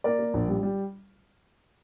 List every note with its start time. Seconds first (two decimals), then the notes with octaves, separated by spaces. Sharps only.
0.04 A#3 A#4 D5
0.19 A#3
0.34 A#1
0.48 G3
0.63 G3